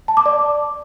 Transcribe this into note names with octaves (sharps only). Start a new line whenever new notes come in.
A5
D6
D5